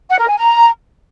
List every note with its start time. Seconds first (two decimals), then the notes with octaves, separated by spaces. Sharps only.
0.10 F#5
0.19 A#4
0.28 G#5
0.38 A#5